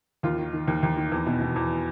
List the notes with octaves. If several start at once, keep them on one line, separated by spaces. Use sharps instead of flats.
D#2 F4
D#3
D#3
D#2
D#2
D#3
E2
B2
B2
E2